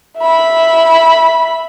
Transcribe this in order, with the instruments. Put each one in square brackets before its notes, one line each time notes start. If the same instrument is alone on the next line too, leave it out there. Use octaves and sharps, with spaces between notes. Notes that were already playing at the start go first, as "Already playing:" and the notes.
[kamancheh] E5 B5